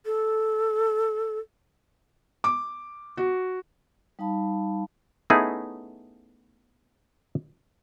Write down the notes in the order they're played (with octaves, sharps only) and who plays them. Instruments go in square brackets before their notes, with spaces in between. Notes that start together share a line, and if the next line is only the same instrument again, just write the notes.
[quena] A4
[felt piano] D6
F#4
[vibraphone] G3 D#4 F5 A5 B5
[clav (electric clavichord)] A3 B3 C#4 D#4 E4 G#4